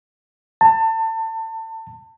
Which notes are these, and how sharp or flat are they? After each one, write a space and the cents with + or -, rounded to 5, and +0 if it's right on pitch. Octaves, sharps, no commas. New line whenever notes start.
A5 +30